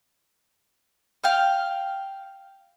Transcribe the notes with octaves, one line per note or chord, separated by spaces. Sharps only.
F5 G5 F6